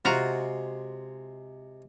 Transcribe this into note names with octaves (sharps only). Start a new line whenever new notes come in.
C3 G#3 F4 F#4 A#5